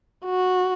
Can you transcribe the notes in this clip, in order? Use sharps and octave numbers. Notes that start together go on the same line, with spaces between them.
F#4